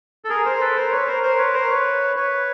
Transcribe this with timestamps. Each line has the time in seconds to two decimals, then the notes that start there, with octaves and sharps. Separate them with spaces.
0.25 A4
0.30 G#4 A#4
0.45 A#4 C5
0.60 A4 B4
0.76 A#4 C5
0.92 B4 C#5
1.07 A#4 C5
1.23 A#4 C5
1.38 B4 C#5
1.54 A#4 C5
1.70 B4 C#5
2.16 B4 C#5